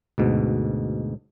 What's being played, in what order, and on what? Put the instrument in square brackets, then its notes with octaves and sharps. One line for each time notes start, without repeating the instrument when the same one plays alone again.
[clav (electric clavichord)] D2 G#2 B2